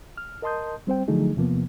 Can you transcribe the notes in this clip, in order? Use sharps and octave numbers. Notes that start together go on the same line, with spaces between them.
F6
A#4 D#5 A5 C6 D#6 G6
G3 C4 C5 G5
D3 F3 F#3 A3 D#4 G#4
E2 C3 F3 A#3 B3